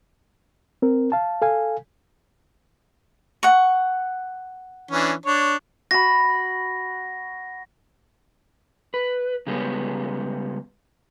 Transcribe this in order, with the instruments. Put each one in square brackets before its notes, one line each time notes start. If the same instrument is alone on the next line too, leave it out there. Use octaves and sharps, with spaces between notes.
[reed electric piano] C4 A#4
F5 A5
A4 F5 G#5
[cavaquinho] F#5 C#6
[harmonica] E3 C#4 D4
D4 C#5
[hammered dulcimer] F#4 B5 [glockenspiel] A#6
[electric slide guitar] B4
C#3 G3 G#3 B3 C#4